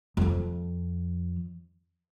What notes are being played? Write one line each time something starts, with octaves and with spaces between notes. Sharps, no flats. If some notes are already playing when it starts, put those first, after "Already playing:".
F2 F3